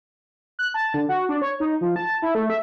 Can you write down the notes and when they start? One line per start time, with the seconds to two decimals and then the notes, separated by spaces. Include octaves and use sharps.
0.59 F#6
0.74 A5
0.94 D3
1.09 F#4
1.29 D4
1.42 C#5
1.60 D#4
1.81 F3
1.96 A5
2.22 E4
2.35 A3
2.50 E5